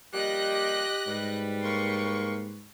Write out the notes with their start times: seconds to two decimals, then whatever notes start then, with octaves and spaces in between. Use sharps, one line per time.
0.14 F3 G3 A#3 G4 D#5 F#6 A#6
1.07 G#2 G3 B4
1.63 A#3 C6 C#6